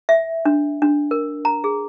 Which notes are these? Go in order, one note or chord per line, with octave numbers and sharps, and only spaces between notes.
E5
D4
D4
A#4
A#5
G#4